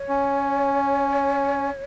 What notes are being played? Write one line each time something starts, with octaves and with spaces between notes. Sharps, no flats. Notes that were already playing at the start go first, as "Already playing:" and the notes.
Already playing: C#5
C#4